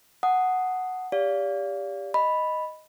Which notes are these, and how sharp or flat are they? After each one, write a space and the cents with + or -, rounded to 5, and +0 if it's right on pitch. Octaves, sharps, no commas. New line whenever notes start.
F#5 +0 A5 +0 D#6 +0
G4 +20 D5 -35 F5 +0
D#5 +0 B5 +0